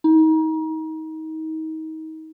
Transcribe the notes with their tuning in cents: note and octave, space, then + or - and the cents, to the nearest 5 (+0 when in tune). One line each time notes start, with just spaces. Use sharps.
D#4 +30